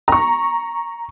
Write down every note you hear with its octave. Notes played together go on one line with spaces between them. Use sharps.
A#5 C#6